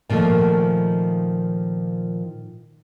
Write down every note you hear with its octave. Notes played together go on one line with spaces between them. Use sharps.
A#2 D#3 F3 A3